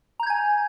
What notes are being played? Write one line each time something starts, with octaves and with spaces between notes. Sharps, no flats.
G#5 A#5 G6 G#6